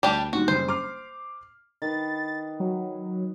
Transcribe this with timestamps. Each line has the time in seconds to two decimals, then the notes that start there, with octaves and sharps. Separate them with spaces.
0.03 D2 G3 D4 G4
0.33 A#2 D#3 G3 F#4
0.48 F#1 C#3 G3 C5
0.68 D6 F6 C7
1.82 D#3 B4 A6
2.60 F#3